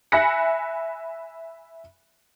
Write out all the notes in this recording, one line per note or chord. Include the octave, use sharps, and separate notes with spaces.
E5 G#5 B5 F#6 A#6 C#7